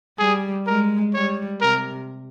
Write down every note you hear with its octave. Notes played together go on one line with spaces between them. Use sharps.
G3 G#4
G#3 A#4
G3 C#5
C3 A#4